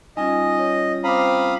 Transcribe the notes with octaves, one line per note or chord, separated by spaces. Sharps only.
G3 C#4 D#4 F4 D#5 G#5
C#5
C4 F5 A#5 B5 D6 D#6